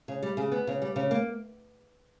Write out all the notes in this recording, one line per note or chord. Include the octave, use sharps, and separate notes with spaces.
C#3
G3
C#3
B3
C#3
G3
C#3
A#3